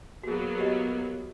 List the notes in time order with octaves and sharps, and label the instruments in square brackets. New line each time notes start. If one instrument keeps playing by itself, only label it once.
[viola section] F#3 A#3 B3 [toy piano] F#4 G#4
[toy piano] G4 D#5